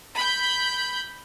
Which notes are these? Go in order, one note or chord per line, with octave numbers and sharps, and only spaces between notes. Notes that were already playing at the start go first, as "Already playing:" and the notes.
B5 G6